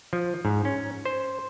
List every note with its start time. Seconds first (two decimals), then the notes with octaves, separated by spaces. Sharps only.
0.13 F3
0.45 G#2
0.65 C#4
1.05 C5